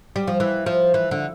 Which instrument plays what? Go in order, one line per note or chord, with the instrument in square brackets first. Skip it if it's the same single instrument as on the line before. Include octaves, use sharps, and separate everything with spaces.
[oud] G3
F3
E3
F3
E3
D3